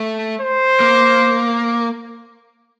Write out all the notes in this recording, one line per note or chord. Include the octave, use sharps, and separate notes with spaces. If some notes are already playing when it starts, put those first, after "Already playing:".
Already playing: A3
C5
A#3